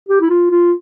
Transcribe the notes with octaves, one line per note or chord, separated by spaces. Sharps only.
G4
E4
F4
F4